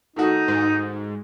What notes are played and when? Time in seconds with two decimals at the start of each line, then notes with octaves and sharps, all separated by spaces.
0.16 D#3 A3 D#4 F#4
0.48 G#2